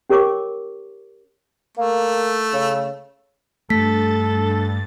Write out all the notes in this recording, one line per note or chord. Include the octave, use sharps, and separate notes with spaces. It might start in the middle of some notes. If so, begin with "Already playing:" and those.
C#4 G4 A#4 C#5 C#6 D6
A3 A#3
C#3
G2 A3 A4 A6 B6